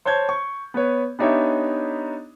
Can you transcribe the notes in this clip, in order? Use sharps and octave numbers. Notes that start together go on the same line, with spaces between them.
C5 C#5 A5 G6 G#6
C#6
B3 B4 C#5
B3 D4 D#4 G4 C#5 E5